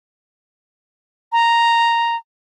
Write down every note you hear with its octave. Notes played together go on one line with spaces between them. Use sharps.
A#5